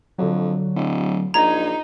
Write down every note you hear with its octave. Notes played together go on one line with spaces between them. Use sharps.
F2 D3 F#3
D1
A#1 D#4 A#5 G#6